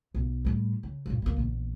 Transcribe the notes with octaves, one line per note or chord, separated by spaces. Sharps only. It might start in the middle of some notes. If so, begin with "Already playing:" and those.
B1
A2 G3
C#3
G2 A#2
C#3 A#3
A#1 E2